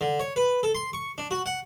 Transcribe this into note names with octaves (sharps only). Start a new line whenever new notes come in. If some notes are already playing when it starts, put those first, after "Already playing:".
D3
C#5
B4
A4
C6
C#6
D4
F#4
F#5